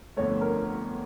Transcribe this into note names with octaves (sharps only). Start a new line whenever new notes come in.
G1 F2 D3 A3 C#5
A#4